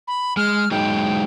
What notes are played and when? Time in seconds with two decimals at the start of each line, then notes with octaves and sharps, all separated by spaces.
0.08 B5
0.37 G#3 F6
0.71 F#3 G#3 D#4 G5